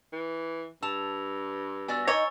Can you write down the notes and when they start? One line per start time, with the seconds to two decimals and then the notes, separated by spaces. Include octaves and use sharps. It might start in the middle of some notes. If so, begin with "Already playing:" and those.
0.12 E3
0.83 G2 A5 E6 F7
1.88 B3 F#4 D5 G#5 E6
2.07 D#4 C#5 D#5 C#6 A6